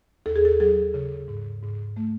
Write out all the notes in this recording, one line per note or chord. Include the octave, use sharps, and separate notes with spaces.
D#2 A4
G#4
A4
F#3 G#4
C#3
G#2
G#2
A3